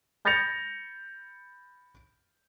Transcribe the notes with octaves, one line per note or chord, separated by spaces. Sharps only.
B5 G6 A6 A#6 C#7 F7